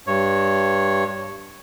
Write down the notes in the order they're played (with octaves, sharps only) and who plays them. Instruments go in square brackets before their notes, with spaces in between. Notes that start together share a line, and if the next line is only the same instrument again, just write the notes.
[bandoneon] G2 C#5